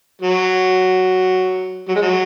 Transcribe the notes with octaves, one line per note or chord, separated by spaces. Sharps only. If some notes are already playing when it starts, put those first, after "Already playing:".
F#3
F#3
G#3
F#3